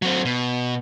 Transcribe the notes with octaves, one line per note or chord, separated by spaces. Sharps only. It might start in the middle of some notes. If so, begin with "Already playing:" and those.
F#3 C4
B2